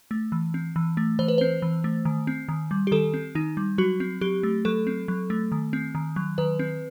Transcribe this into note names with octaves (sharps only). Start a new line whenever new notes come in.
A3
E3
C4
E3
A3
E3 C5
B4
C4 C5
E3
A3
D#3
C4
D#3
G3
G4
D#3 A4
C4
D#3 D#4
G3
F#3 F#4
C4
F#3 G4
A3
F#3 A4
C4
F#3
A3
D#3
C4
D#3
F#3
D#3 B4
C4